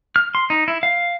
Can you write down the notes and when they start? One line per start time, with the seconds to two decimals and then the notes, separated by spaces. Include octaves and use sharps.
0.16 F6
0.35 C6
0.50 D#4
0.68 E4
0.83 F5